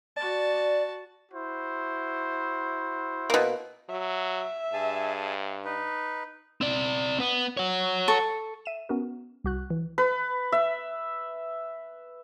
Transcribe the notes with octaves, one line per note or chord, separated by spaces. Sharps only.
F#4 D5 A5
E4 F#4 C5
B2 A#3
F#3 E5
G2 G#4 G#5 A5
D#4 B4
C4 D5
B3
C#5 F#5
A4 C#6
E5 D#7 E7
B3 C#4 F#4 A#4
C2 F#4 F#6
E3
B4
E5